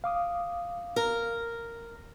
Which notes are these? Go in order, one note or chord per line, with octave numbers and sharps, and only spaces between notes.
F5 D6 D#6
A#4